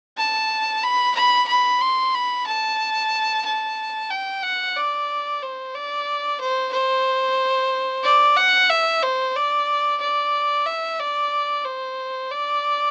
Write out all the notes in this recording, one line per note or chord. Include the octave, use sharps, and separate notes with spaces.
A5
B5
B5
B5
C6
B5
A5
A5
G5
F#5
D5
C5
D5
C5
C5
D5
F#5
E5
C5
D5
D5
E5
D5
C5
D5